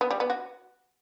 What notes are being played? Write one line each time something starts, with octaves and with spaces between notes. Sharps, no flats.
B3
G3
B3
F#4